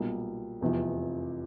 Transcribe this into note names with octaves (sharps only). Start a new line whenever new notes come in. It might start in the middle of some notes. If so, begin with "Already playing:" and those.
Already playing: B1 A#2 G3
F1 E2 C3 F3